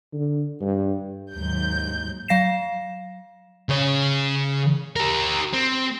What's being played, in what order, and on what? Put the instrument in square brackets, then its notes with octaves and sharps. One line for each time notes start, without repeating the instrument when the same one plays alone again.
[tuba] D3
G2
[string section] D#2 G#2 F#3 G6
[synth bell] F#3 F5 A#6 C7 E7
[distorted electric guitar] C#3 C#5
G4 A#4
C4